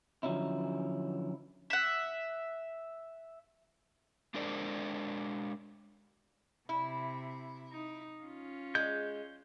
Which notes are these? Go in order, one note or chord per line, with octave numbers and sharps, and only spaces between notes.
D3 F3 F#3 C#4 D#4 E4
E5 F#5
G#3 D4 A#4 C5 D5
C3 E4
D#4
C#4 F4
G#3 G6